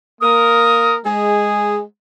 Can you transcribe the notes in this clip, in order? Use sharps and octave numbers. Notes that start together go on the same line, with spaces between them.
A#3 A#4 D#6
G#3 G#4